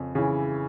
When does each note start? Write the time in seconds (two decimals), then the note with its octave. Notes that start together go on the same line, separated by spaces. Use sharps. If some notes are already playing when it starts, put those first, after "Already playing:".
Already playing: F2 C#3
0.15 C#3 E3